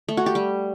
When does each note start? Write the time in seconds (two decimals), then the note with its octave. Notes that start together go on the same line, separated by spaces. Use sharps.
0.08 A3
0.17 F#4
0.26 G4
0.35 G3